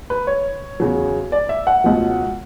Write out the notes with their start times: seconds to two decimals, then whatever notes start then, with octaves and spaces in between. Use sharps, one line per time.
0.10 B4
0.27 C#5
0.80 E2 C#3 F#3
1.32 D5
1.49 E5
1.67 F#5
1.84 C#2 B2 F#3